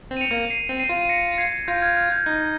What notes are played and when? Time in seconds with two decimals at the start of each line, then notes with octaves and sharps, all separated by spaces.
0.11 C4
0.17 D#7
0.21 C#7 F7
0.31 A#3
0.50 C7 D#7
0.69 C4
0.80 C7 D#7
0.89 F4
1.02 D#7
1.09 A#6 C#7
1.34 C#7
1.38 G#6 C7
1.68 F4 G6 A#6
1.82 F6 G#6
1.96 F6 G#6
2.12 G6
2.26 D#4